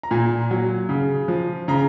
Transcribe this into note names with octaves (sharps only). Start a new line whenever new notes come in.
A#5
A#2 G#5
F#3
C#3
F3
C#3 A#5